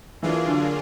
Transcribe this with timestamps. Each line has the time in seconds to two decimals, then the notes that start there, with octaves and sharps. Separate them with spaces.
0.23 E3 F#3 A#3 D4 F4 G#4
0.47 D3